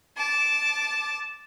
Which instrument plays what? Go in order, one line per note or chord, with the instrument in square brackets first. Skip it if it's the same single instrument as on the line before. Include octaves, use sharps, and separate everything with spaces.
[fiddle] A5 D6